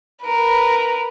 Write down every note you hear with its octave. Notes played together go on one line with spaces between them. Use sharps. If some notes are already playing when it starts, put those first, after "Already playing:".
A#4 B4